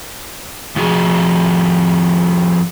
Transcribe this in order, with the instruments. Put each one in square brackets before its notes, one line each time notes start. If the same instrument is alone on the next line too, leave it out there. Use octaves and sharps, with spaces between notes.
[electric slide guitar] F2 F3 F#4 G#4